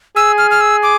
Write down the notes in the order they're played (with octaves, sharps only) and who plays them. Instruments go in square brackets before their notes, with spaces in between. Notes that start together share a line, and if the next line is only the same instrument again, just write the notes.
[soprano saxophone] G#4 [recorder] E6
[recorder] F6
F6
E6
D6